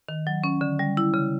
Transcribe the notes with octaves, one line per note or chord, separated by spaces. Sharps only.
D#3
F#3
C#4
D3
G3
E4
C#3